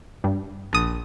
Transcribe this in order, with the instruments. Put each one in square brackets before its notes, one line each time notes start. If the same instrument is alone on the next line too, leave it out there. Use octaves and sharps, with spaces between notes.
[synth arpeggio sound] G2
[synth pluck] A#1 D#6